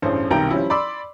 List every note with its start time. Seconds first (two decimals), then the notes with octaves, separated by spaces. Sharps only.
0.02 E1 A1 G2 C#4 C5
0.30 B1 C3 D#3 G3 G5 A#5
0.50 F3 G3 C#4 E4
0.70 D5 B5 C6 D6 E6